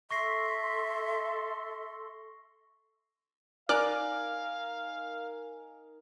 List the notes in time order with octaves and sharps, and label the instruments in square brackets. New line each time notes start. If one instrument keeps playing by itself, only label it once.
[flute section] A4 C6 [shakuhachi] E5 [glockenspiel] C#6 A#6 C7
[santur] D#4 A#4 G#5 [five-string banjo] D5 [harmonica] F5 [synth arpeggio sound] D6 F6 F#6